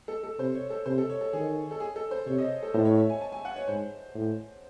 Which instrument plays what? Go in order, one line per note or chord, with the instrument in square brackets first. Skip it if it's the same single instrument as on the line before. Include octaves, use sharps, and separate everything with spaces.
[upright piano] A4
A4
[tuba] C3 [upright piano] C5
[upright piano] C#5
A4
[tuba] C3 [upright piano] C5
[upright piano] A4
C#5
A4
[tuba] D#3 [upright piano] G#4
[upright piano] A4
G#4
A4
C5
[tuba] C3 [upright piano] C#5
[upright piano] D#5
A4
[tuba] A2 [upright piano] C5
[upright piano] C#5
E5
G#5
A5
G#5
F#5
C#5
[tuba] G#2 [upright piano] C5
[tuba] A2